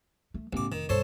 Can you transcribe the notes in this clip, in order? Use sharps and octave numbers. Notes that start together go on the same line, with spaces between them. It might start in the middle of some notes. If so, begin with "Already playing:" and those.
A3
A1 C#3 B3 D6
F1 D#3
B1 G2 A4 C5 C#5